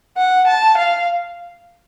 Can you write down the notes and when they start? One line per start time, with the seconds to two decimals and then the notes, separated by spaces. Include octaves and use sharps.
0.17 F#5
0.47 A5
0.77 F5